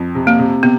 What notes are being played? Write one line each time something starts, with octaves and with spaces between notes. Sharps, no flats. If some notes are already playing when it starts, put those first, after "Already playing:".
Already playing: F2
C3
A#3
C3
C3 B3